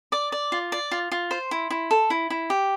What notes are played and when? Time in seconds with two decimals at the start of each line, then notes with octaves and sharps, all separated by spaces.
0.12 D5 D6
0.32 D5
0.52 F4
0.72 D5
0.91 F4
1.12 F4
1.31 C5 C6
1.51 E4
1.70 E4
1.91 A4
2.10 E4
2.30 E4
2.50 G4